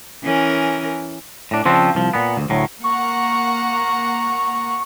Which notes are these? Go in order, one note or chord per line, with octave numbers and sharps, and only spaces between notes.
E3 C#4 A#4
A2 D4
C#3 F3 C4 D4
C2 F3
A#2 B3
D2
D2 A2 F#3
A#3 F#5 A#5 C#6